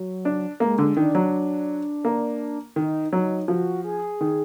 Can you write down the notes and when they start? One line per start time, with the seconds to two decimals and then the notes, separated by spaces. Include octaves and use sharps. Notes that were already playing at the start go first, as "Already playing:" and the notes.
Already playing: F#3
0.25 D4
0.60 G#3 A#3
0.78 D3
0.97 D#3 D4
1.15 F#3
2.05 A#3
2.76 D#3 D#4
3.13 F#3 D#4
3.48 F3 F#4
3.84 G#4
4.21 D#3